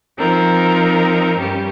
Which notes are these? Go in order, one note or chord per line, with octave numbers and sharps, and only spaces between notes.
F3 C4 D#4 A#4
G2 G3 C#4 G4